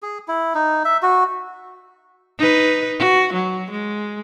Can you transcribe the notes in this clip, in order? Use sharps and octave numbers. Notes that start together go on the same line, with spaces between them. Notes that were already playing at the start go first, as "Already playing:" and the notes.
G#4
E4
D#4
E5
F#4
D#4 B4
F#4
F#3
G#3